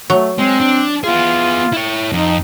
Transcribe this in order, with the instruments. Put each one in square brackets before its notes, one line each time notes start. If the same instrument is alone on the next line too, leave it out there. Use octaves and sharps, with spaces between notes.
[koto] F#3 [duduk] A3
[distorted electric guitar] G#3 [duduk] C4
[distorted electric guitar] D4
[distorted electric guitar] B3 G#4 [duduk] F4
[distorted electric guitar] E4 C#5
[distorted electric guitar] F2 [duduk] D#4